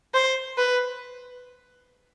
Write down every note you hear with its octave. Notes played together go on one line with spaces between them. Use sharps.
C5
B4